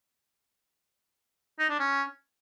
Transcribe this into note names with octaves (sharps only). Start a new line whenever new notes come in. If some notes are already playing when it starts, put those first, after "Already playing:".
D#4
D4
C#4